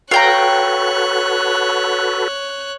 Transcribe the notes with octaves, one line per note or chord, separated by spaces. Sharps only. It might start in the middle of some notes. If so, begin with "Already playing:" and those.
F#4 A4 B4 C#5 F5 G5 A#5 F#6